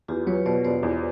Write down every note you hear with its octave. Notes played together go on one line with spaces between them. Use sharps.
E2 F4 G4
F#3 B4 C#5
B2 C5 D5
E1 C5 D5
E2